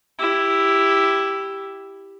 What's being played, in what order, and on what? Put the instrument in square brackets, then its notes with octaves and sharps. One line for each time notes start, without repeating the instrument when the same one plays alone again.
[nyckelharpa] E4 G4